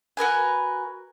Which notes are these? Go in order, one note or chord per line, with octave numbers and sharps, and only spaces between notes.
F#4 A#4 B4 G#5